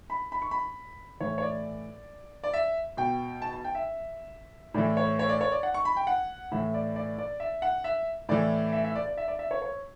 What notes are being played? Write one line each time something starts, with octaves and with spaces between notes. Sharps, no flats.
B5
B5
C#6
B5
A2 E3 C#5
C#5
D5
D5
E5
B2 G5
A5
A5
G5
E5
A2 E3 D5
C#5
C#5
D5
C#5
D5
F#5
C#6
B5
G5
F#5
A2 E3 E5
D5
D5
D5
E5
F#5
E5
A2 E3 D5
E5
E5
D5
D5
E5
D5
E5
C#5
C#5